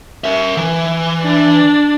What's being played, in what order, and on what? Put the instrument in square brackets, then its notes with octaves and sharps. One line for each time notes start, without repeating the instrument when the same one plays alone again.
[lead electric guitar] A#4 E5
E3
[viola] D4